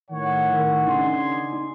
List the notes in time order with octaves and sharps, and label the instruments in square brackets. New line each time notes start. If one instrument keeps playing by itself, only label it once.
[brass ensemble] A2 F#5 [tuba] D#3 [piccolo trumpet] C#5
[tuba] D#3
[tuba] C#3 [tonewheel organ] D4 D#4 G#5 [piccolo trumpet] C6